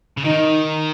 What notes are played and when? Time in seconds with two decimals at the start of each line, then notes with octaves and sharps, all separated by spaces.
0.17 C#3
0.24 D#3 D#4